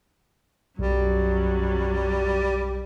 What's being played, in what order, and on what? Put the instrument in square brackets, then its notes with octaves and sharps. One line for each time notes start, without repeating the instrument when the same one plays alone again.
[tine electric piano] B1 [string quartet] F#2 F#3 [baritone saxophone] G3